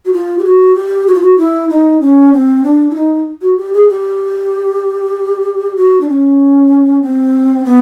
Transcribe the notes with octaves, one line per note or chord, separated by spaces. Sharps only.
F#4
F4
G4
F#4
G4
F#4
F4
F#4
E4
D#4
C#4
C4
D4
E4
D#4
F#4
G4
G#4
G4
F#4
D4
C#4
C4
B3